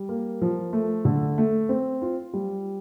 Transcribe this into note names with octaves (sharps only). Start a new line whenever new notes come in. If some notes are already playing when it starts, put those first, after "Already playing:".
Already playing: G3
A#3
F3
A3
D3
A3
C4
F4
G3